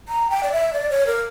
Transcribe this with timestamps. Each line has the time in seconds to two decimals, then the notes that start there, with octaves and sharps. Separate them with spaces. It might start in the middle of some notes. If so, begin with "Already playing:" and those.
0.08 A#5
0.30 G5
0.43 D5
0.52 E5
0.73 D5
0.90 C#5
1.07 A#4